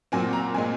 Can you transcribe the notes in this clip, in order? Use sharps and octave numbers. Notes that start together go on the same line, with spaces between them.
A#2 F#3 C4 G#5
A#5
A#2 G#3 C4 G#5